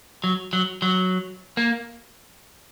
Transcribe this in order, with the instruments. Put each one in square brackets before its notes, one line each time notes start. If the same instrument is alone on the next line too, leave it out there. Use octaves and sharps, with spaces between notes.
[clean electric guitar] F#3
F#3
F#3
A#3